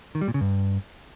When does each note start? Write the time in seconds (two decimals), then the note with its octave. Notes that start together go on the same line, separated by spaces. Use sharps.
0.15 D#3
0.21 G3
0.28 A#2
0.34 C#3
0.41 G2